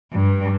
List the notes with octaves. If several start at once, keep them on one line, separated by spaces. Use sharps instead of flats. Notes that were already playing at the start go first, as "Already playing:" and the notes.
G2